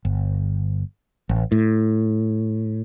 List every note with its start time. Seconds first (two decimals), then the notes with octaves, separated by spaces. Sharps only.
0.05 G1
1.29 A1
1.52 A2